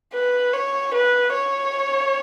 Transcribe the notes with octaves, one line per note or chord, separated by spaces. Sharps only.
B4
C#5
B4
C#5